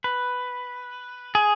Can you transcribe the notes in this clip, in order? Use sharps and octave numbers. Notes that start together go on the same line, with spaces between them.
B4
G#4